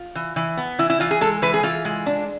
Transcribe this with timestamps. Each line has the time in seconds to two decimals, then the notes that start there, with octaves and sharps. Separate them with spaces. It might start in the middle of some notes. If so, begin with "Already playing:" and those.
Already playing: F4
0.15 E3
0.36 E3
0.57 B3
0.79 E3 E4
0.90 E4
1.00 E3 F4
1.11 G#4
1.21 G#3 A4
1.42 E3 B4
1.54 G#4
1.63 E3 F4
1.85 G#3
2.06 D4